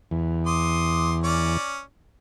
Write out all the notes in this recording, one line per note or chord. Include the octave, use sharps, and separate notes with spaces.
E2
C6 D6 D#6
C#4 D5